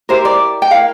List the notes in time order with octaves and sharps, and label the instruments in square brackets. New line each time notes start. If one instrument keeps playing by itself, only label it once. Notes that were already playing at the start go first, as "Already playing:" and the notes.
[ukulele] E4 G4 A#4 C5
D5
G5
E4 A#4 F5